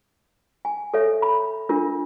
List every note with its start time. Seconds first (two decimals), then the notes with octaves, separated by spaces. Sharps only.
0.65 G#5
0.94 A4 C#5 E5
1.22 B5
1.69 D4 F4 A#4